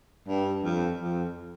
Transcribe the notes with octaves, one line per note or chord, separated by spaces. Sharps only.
G2
F2
F2